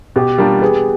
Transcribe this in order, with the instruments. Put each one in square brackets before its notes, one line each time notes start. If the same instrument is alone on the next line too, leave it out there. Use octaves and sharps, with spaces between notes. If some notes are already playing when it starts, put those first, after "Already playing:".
[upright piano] B2 [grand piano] G4
[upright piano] G3 A#3 D4 F4 [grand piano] G4
[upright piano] B3 [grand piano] G#4